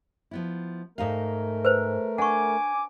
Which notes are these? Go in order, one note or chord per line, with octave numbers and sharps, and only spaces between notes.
F3 B3 E4
G#2 A3 D#4 A#4 F5
B4 C5
D4 F#5 G#5 C#6 D6